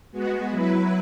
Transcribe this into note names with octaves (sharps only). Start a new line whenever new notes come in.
G#3 B3 F#4
F#3 E4 B4